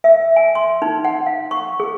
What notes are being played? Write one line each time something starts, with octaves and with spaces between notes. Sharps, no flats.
E5
G#5
C6
D#4
F#5
F5
C#6
G#4